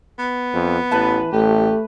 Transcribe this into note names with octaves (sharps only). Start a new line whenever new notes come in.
B3
F2
A1 E3 B4 A5 B5
A1 A3 G4